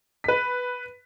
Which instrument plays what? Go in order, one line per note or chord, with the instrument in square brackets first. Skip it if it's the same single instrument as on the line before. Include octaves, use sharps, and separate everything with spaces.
[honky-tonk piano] B4 B6